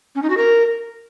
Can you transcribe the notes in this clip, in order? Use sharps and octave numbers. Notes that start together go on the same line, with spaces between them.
C#4
D#4
F#4
A#4